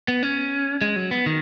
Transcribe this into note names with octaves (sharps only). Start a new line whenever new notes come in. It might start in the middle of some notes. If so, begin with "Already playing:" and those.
B3
C#4
G#3
F#3
B3
D#3